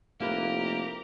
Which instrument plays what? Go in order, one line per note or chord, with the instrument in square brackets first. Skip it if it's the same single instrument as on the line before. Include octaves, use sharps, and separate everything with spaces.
[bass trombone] F1 [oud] A#3 E4 B4 [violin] G4 A#5